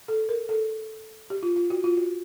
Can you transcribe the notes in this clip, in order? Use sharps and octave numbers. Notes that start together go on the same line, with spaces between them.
A4
A#4
A4
G4
F4
F4
F#4
F4
F#4